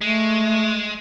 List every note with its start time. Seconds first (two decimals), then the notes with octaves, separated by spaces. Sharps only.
0.01 G#3 A3